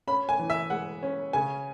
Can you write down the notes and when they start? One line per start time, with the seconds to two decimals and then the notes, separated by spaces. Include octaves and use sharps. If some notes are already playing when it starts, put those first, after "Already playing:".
0.07 C#4 B5
0.29 G#5
0.39 E3
0.50 E5
0.70 G#3 F#5
1.03 C#4
1.33 C#3 G#5